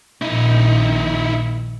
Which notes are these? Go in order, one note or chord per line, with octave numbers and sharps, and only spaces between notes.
A#1 A#2 D#3 D#4 E4